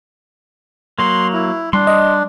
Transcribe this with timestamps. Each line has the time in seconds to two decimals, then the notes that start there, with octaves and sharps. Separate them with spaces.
0.99 F#3 A#3 C6
1.33 E4
1.73 G3 D4 C6
1.87 D#5